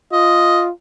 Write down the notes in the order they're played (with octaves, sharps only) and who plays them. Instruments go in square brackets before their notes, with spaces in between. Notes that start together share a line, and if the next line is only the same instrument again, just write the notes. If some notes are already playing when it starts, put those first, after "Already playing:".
[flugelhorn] F4 [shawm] D#5